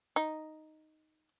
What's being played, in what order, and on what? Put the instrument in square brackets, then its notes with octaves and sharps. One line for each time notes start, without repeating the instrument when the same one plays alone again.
[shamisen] D#4